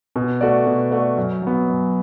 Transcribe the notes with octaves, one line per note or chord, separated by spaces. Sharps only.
B2
A3 F#4 D5
B2
A3 F#4 D5
F#2
F#3 B3
F#2